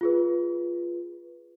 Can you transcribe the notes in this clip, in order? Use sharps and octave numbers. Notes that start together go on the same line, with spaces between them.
F4 G#4 B4